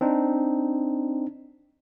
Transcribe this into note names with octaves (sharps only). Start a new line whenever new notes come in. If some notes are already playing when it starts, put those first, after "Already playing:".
C4 D4 D#4